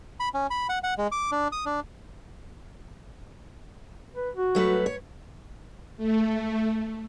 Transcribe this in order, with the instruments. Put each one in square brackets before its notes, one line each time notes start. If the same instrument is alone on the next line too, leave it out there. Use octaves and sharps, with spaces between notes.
[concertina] B5
C#4
B5
F#5
F#5
G#3
D6
D4
D#6
D4
[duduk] B4
F#4
[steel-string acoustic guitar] F#3 A3 B4
C#5
[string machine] A3